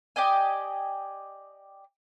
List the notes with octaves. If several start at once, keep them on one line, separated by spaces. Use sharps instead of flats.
G4 D5 D#5 G#5